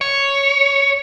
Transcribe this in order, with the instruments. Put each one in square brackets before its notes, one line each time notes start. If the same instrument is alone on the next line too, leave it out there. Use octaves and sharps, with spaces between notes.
[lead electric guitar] C#5